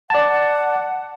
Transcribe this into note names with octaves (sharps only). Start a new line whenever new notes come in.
D5 F#5 A5